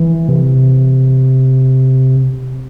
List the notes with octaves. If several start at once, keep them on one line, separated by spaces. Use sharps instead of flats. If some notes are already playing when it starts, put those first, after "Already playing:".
Already playing: E3
C3